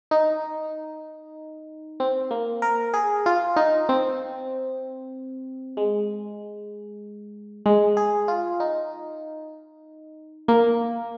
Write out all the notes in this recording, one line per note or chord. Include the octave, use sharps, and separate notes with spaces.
D#4
C4
A#3
A#4
G#4
F4
D#4
C4
G#3
G#3
G#4
F4
D#4
A#3